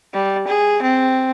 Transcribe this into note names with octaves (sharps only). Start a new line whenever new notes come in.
G3
G#4
C4